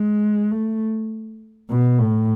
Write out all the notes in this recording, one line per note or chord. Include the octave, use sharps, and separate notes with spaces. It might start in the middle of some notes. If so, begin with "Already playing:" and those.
Already playing: G#3
A3
B2
A2